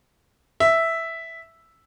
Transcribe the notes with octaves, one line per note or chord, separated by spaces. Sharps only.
E5